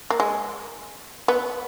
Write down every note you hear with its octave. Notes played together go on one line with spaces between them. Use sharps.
A#3
G#3
B3